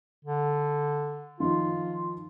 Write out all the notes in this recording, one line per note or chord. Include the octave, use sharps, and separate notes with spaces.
D3
D#3 F3 D#4 F4